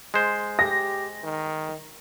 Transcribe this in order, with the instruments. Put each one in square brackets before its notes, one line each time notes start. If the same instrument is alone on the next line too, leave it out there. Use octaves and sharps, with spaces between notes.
[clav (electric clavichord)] G#3 C5
[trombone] G4 [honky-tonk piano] A#6
[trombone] D#3